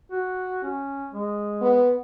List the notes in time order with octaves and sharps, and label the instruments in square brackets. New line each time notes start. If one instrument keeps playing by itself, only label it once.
[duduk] F#4
C#4
G#3
[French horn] B3